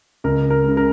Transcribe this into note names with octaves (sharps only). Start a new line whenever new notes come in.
C#2 A#4
A#4
C#3 G#3
A#4